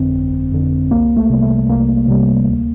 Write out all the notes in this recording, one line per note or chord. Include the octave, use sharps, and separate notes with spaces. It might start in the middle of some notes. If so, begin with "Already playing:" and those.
Already playing: G1 F2 D3 C4
G1
F2 D3
C2 A#3
A3
C3 G3
A3
C2 A#3
C3 G3
D2